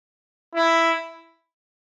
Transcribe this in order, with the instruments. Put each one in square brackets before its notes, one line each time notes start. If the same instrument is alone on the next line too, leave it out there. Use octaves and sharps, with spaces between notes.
[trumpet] E4